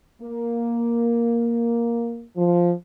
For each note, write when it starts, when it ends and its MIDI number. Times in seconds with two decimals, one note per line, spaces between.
0.22 2.25 58
2.36 2.71 53